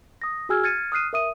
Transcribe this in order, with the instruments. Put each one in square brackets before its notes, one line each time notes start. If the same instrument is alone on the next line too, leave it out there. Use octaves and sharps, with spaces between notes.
[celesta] D#6 A#6
F#4 G#4 G#5 E6 F6 G#6
F6 G#6 A6 C#7 D#7
D#6 F6 F#6 C7 D#7
A#4 E5 D#6 D#7